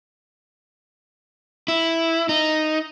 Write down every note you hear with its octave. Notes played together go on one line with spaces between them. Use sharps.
E4
D#4